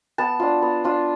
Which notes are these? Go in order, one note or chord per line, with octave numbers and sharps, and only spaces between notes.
B3 A5
D4 F4
B3
D4 F4